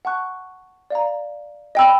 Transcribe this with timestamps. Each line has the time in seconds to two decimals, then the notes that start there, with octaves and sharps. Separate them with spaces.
0.05 F#5 A5 C#6 F#6
0.90 D5 F5 A#5
1.75 D#5 G5 B5 E6